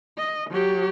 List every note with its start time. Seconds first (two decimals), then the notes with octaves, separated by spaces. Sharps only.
0.18 D#5
0.50 F#3 G4